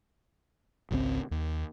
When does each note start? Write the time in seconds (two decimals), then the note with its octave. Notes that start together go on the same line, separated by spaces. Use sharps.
0.91 G#1 C#2 D#3 C4
1.31 D#2